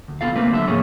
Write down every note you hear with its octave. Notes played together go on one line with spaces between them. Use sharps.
D2
B1 B3 F4 A4 F5
A3 A#3 C4 D4 B4
D3 F#3 A4 E5
A2 F3 A#3 G#4 C#5